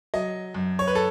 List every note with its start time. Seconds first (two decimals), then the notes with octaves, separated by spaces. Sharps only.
0.14 F#3 D#5
0.54 F#2
0.79 C#5
0.87 B4
0.95 A4